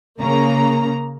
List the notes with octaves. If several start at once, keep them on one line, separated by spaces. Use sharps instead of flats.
C#3 A#3 A#5